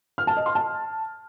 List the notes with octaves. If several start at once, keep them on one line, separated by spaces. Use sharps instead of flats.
F6
A5
D#5
C6
A5